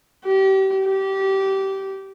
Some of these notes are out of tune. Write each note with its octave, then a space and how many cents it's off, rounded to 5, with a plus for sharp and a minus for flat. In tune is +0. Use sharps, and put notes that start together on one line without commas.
G4 -30
G4 -20